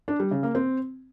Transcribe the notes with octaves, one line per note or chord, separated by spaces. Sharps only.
D4
G3
C#3
A#3
C4